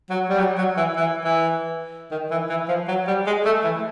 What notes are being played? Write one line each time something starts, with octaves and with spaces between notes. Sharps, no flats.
F#3
G3
F#3
F#3
E3
E3
E3
D#3
E3
E3
F3
F#3
G3
G#3
A3
E3